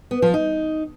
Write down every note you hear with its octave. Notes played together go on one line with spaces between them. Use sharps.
B3
F3
D#4